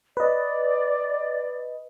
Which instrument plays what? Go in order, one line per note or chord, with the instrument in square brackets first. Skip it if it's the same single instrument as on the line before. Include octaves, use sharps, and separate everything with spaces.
[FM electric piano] B4 D#5 [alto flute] D5